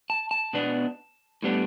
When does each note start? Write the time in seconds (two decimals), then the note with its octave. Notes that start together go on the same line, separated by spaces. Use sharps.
0.10 A5
0.31 A5
0.53 B2 B3 D4
1.42 A2 G3 B3 D4